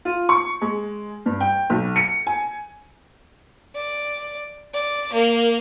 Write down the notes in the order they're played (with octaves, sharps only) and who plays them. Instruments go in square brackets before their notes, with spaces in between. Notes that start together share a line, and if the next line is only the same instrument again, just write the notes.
[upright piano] F4
C#6
G#3
G2
G5
B1
C#7
G#5
[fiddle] D5
D5
A#3